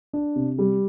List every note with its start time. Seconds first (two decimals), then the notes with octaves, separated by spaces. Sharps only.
0.13 D4
0.36 C3
0.59 G3